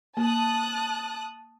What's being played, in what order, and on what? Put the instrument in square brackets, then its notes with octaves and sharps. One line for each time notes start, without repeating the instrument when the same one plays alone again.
[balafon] A#3 [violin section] A5 D#6 F#6